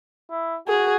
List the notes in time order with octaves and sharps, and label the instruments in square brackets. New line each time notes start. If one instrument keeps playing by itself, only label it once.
[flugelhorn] E4
[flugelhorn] F#4 [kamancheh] G#4